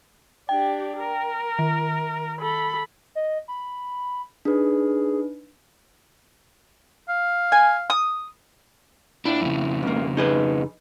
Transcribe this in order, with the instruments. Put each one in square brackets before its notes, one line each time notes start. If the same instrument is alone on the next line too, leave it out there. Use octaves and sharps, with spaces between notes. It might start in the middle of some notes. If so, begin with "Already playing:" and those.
[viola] D4 G4 [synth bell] G5
[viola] A#4
[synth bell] D#3
[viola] A4 B5
[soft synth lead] D#5
B5
[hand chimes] D4 D#4 B4 [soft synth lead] G#4
[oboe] F5
[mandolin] G#5
D#6
[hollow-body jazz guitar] A#2 E4 [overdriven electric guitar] D4
[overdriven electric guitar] F2 C#3
[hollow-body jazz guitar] C#2 A#3
D#4 G#4 B4